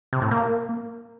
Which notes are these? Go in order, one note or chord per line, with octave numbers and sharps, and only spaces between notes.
C3
A2
A#3